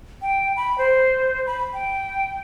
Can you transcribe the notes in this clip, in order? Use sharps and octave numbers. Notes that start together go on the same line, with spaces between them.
G5
B5
C5
B5
G5